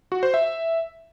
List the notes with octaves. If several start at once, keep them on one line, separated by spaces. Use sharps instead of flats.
F#4
C5
E5